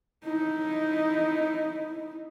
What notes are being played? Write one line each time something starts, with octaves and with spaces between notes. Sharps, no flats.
D#4 E4